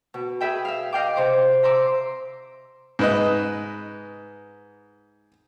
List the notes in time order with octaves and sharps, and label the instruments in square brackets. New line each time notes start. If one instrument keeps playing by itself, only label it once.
[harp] B2
G#4 B4 E5 G5
E5 F5
D#5 F5 G5 D6
C3 C5 D6
E5 A#5 C6 D6 E6
[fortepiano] G#2 B4 D#5